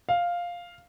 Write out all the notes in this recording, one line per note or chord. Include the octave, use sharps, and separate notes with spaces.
F5